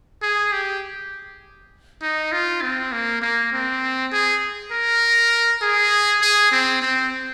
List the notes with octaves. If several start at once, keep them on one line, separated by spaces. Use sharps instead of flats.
G#4
G4
D#4
F4
C4
A#3
A#3
C4
G#4
A#4
G#4
G#4
C4
C4